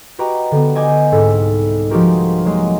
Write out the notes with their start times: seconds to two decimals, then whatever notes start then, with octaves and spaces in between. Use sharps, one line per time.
0.18 F#4 G4 B4 D#5 G5 A#5
0.51 D3 B3
0.75 D#5 G#5 D6 G6
1.12 C2 G#2 A4 G5 B6
1.90 F3 G#3 D#4 F#4 G4 A#4
2.45 F#3 G#3 A#3